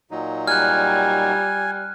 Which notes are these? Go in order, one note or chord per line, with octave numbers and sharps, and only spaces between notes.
A#2 F#3 D#4
G3 G#5 F6 F#6